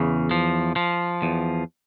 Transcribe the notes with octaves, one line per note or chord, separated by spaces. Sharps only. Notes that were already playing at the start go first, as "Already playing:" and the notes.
Already playing: E2 C#3
F3
F3
E2